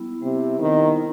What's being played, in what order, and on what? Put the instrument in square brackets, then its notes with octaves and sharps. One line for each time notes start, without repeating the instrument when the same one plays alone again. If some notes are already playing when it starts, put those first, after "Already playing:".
Already playing: [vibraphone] G3 B3 E4
[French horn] C3 [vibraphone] G3
[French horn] D#3 [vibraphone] B3 E4
[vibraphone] D#4